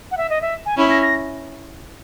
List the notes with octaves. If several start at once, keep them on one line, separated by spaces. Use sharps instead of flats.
F#5
E5
D#5
E5
G#5
C#4 E4 B5
A#6
A#6